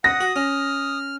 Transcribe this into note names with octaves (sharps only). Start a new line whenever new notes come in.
F#5 D#6 A#6
F#4
C#4 F6